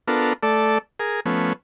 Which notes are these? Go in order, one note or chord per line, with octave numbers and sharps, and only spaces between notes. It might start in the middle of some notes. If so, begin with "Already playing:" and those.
B3 D4 F4 A4 A#4
A3 A4 D5
G#4 A#4
F3 A3 B3 C#4